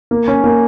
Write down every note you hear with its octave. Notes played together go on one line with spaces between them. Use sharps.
A#3
C#4
A#3